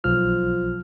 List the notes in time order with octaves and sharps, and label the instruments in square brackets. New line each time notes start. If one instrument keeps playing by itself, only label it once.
[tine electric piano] B1 F6 [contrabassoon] F3